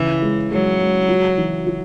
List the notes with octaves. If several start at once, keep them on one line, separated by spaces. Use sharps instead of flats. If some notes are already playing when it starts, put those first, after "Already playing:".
Already playing: C#3 E3 E4
G#3
F#3 G#3
G#3
F#4
E3
F#4